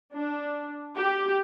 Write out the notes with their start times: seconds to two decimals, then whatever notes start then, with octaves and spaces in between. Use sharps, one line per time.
0.13 D4
0.97 G4